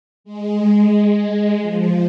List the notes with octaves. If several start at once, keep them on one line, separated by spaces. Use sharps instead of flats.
G#3
G#3
F3